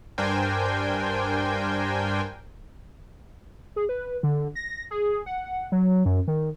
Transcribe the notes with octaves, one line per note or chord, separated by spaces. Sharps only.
G2 D4 A#4 C5 G5 G#5
G#4
B4
D3
A#6
G#4
F#5
F#3
F#2
D#3